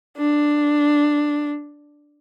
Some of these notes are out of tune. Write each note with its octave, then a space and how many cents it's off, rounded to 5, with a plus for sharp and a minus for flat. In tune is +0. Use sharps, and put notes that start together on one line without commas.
D4 +5